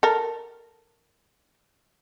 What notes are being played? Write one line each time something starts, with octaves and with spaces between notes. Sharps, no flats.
A4 A#4